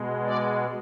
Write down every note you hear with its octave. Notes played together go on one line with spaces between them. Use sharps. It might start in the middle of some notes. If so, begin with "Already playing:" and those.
Already playing: B2 G#3
D5